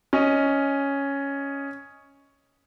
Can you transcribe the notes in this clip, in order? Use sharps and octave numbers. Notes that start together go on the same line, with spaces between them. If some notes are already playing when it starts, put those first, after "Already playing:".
C#4 D#5